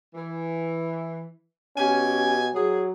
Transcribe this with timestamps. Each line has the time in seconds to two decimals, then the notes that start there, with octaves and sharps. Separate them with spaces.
0.14 E3
1.77 B2 C#4 G4 G#5
2.55 F#3 G#4